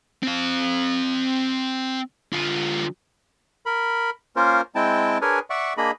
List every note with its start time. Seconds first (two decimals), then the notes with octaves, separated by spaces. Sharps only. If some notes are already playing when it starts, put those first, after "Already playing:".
0.23 C4 F5
2.33 D3 F4
3.66 A#4 B5
4.36 A#3 C#4 F4 A#4 C5
4.75 G#3 C4 E4 G5 A5
5.21 D4 G#4 A#4 B4 C#5 G#5
5.50 D5 E5 F#5 C#6
5.78 A#3 D4 G#4 D#5 B5